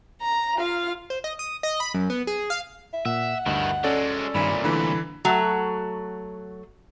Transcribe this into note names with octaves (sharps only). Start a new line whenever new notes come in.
A#5
F4 F5
C5
D#5
D#6
D#5
B5
F#2
B3
G#4
F5
E5
A#2 E5 F#5
D2 G2 D#3 E4 D#5
F#3 G#3 C#4 A4 D5
C2 G2 A#2 D#3 G#5 B5
D3 E3 A3 B5
F#3 A3 F#4